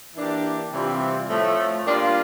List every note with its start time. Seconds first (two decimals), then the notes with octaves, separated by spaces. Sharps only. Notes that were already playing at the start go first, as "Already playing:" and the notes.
0.15 E3 A#3 D4 G4
0.72 C3 E3 G3 C4 F4
1.29 A2 F3 A3
1.85 G3 A#3 D4 F4